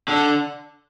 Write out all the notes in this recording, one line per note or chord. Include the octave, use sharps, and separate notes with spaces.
D3